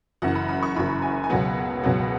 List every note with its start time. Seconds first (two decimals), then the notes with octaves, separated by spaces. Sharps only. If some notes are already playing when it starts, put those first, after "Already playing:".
0.22 F#1 F#2 E3 F#5
0.35 B5
0.49 B5
0.63 C#6
0.75 F#1 F#2 E3 B5
1.02 G#5
1.24 G#5
1.29 C#2 B2 F#3 B3 F#5
1.83 C#2 B2 F#3 B3 F#5